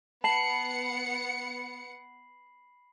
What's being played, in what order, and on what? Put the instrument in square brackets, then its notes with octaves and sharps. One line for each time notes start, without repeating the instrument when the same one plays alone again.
[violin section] B3 F#5 C#7 [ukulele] A5 [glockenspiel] B5 C7 F#7